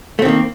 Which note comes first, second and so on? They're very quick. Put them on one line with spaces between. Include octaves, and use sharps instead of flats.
A3 C4 D#3 A#3